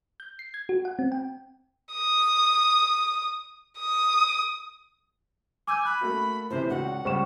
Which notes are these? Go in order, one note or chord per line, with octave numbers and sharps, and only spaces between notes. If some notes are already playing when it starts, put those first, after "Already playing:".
G6
C7
G#6
F#4
F#5
C4
G5
D#6
D#6
G#5 D6 E6 G6
B5 F#6
A3 A#3 F#4
A2 C3 E3 C5
C#2 D4 F#4 F#5
C#2 G3 C5 C#6 E7